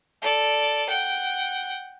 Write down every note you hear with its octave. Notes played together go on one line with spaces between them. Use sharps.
A4 D5
F#5 G5